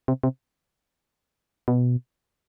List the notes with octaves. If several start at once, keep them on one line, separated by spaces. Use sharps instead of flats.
C3
C3
B2